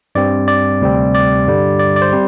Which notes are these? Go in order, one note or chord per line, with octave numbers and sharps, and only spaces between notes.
G2 G3 C4 D5
D5
D2 C3 G3 C4
D5
G2 D3 G3
D5
D5
C5
G3 C4